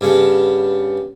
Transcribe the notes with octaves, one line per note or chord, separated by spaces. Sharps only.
G2 C#3 B3